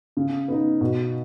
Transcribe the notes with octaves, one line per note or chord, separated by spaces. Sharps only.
C#3
B3 D#4
B2